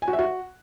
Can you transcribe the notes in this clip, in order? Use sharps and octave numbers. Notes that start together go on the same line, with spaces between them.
G#5
F#4
E5
F#4